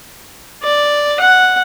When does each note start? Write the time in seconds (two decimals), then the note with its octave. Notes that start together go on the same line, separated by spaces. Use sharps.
0.63 D5
1.20 F#5